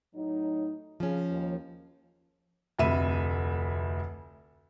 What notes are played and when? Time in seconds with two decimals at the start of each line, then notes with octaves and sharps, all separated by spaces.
0.14 A2 F#3 D#4
1.00 C#3 F3 C#4
1.31 D#2
2.79 F1 D2 E5 B5 D#7